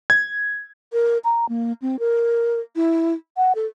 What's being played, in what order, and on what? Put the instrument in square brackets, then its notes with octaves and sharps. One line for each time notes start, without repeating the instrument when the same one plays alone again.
[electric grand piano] G#6
[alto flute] A#4
A#5
A#3
C4
A#4
E4
F#5
A4